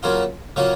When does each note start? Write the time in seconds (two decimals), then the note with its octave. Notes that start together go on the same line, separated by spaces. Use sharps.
0.03 C#3 F#3 A#3 C#4 F4
0.56 C#3 F#3 A#3 C#4 F4